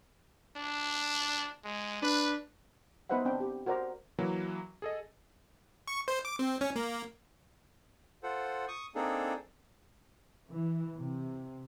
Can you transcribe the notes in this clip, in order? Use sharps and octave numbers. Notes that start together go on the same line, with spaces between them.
D4
G#3
D4 B4
B3 D#4 B4 C5 E5 F#5
C4 D4 G5
G4
F#4 A#4 C5 D5 A#5
E3 F#3 A#3
G#4 A4 D#5
C#6
C5
D6
C4
C#4
A#3
F4 A4 C5 F#5
C#6 D#6
A#3 C4 D4 D#4 G#4 A4
E3
C3